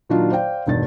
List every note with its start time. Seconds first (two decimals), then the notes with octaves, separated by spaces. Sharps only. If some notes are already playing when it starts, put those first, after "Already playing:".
0.09 A#2 D#3 F#3 D4 D#4 F4
0.31 C5 D5 F5 G5
0.67 E1 G2 D#3 A6